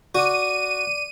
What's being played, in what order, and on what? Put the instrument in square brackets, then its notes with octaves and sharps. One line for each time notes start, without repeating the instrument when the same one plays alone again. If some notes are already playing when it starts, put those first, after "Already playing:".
[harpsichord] F#4 [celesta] D5 D6 [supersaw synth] D#7